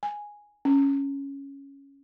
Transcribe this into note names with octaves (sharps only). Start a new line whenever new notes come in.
G#5
C#4